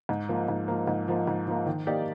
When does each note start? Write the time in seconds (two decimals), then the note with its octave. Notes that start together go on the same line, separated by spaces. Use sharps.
0.09 G#2
0.29 F3 A#3
0.48 G#2
0.68 F3 A#3
0.88 G#2
1.08 F3 A#3
1.27 G#2
1.47 F3 A#3
1.66 D#3
1.87 A#3 D#4 G4 D5